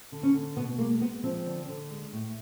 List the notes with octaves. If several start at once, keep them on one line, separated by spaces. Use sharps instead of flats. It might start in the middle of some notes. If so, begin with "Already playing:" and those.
D3
C#4
D3
B2 B3
G#3 A#3
G#3 B3
F3 C4
D3
D3
G#3
A2